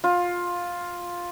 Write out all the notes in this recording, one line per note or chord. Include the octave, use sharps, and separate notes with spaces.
F4